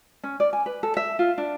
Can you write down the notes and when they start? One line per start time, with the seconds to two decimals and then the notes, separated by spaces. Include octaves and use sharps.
0.24 C#4
0.40 D5
0.53 G#5
0.66 B4
0.83 A4
0.97 E5
1.19 F4
1.38 D4